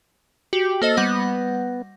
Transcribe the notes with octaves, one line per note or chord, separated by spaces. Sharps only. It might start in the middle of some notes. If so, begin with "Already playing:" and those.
F#4 G4
A#3 A4 C5 D#5
G3 B3 F#5 A#6